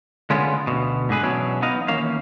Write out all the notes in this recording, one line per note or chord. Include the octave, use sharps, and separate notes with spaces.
D3 G#3 B3 C#4 F4
D2 B2
G#2 D3 G#4 B4
E2 B2 F#3 C#4 D4
B3 D#4 D#5 F5
D#2 E3 A#3 C#4 F5